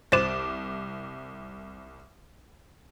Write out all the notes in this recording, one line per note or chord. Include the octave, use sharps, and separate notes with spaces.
C2 C5 D6 F#6 A6 E7